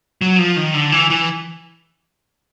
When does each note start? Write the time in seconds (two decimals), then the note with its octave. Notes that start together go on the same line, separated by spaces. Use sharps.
0.21 F#3
0.39 F3
0.56 D#3
0.74 D3
0.92 E3
1.10 E3